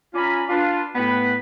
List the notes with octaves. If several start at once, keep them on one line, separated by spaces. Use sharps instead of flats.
C#4 F4 D5 G#5 A#5 B5
D4 F4 B4
A2 B3 B4 F#5 G5 B5